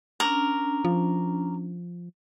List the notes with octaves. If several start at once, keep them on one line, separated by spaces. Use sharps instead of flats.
C#4 D4 A#4
F3